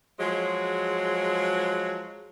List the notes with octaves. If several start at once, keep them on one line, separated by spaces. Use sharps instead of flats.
F3 F#3 G#3